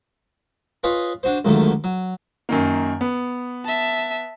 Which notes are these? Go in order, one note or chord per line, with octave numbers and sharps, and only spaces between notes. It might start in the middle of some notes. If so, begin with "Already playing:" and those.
F4 G#4 B4 C#5 D#5
D4 F#4 C5
C#2 F#2 D3 D#3 A3
F#3
F#2 D#3 A#3
B3
E5 A5